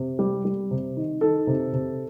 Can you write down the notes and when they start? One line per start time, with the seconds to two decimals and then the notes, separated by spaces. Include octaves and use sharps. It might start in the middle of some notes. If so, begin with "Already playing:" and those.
Already playing: C3
0.19 G3
0.45 G3
0.71 C3
0.97 D#3
1.21 D#3 A4
1.47 C3
1.73 C3